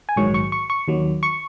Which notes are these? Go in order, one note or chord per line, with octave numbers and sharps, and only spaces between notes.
G#5
A#1 G#2 D#3 F#3 C#6
C#6
C#6
C#6
D#2 D#3 F#3
C#6